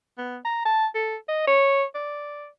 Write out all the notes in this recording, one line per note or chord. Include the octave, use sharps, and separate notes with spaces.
B3
A#5
A5
A4
D#5
C#5
D5